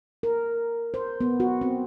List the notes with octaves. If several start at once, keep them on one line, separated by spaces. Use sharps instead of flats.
A#4
C5
B3
F#4
C4